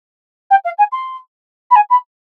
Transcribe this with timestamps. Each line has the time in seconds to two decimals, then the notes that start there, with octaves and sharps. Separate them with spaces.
0.50 G5
0.64 F5
0.78 G#5
0.92 C6
1.70 B5
1.75 G#5
1.90 B5